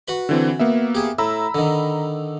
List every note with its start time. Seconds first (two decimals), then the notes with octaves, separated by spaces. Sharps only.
0.08 F#4 B4 B5
0.29 D3 E3 C4
0.60 A#3 B3 E5
0.95 G4 G#4
1.19 A2 A#5 B5 E6
1.55 D3 D#3